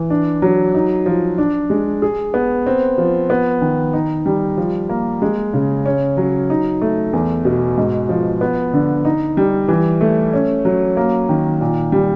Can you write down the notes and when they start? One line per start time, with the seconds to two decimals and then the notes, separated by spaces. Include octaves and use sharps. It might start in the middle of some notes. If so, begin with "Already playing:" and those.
Already playing: E3
0.10 D4
0.42 F#3
0.74 D#4
1.06 F3
1.38 D4
1.70 G#3
2.02 G#4
2.34 B3
2.67 C4
2.98 F3
3.30 B3
3.61 D#3
3.93 D#4
4.26 G3
4.57 F3
4.89 A#3
5.22 G#3
5.53 C#3
5.86 C#4
6.17 F#3
6.50 D#4
6.81 A3
7.13 E2
7.45 B2
7.78 G#2
8.09 F3
8.41 B3
8.74 D3
9.05 D#4
9.37 G3
9.68 E3
10.01 A3
10.33 C#4
10.65 F#3
10.97 A#3
11.29 D#3
11.61 A#2
11.92 G3